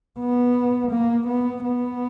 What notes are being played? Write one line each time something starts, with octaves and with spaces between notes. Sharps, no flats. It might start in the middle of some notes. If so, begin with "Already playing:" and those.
B3
A#3
B3
B3